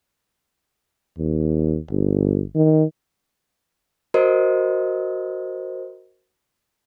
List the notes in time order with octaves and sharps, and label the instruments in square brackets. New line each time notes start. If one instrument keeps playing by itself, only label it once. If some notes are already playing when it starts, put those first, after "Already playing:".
[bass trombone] D#2
G1
D#3
[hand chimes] F#4 A#4 C5 D#5